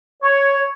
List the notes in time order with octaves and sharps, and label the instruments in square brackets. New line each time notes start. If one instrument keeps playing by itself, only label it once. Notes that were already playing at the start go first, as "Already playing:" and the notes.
[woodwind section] C#5